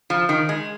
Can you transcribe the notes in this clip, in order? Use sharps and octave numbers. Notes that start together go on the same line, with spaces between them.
F3
D#3
G#3